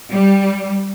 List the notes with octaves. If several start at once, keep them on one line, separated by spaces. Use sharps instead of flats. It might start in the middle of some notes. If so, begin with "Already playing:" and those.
G3